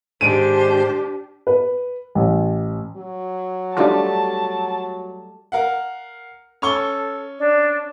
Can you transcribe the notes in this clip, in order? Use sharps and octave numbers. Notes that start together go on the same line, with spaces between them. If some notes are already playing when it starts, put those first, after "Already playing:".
G#2 D#3 G#3 D4 G4 C5 D7 D#7
B4
A1
F#3
G3 A3 D4 F4 G4 A5
A#4 F5 F#5
C#4 A4 C#6 G7
D4